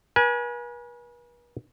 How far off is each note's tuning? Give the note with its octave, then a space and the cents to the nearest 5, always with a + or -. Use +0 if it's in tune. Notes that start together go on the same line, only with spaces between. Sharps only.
B4 -45 G#5 +10